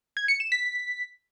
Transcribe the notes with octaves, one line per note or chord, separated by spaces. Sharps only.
G#6
C#7
E7
B6